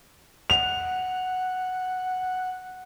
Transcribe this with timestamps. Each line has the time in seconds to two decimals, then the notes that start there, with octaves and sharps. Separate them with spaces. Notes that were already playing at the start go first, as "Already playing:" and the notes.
0.50 F#5 F7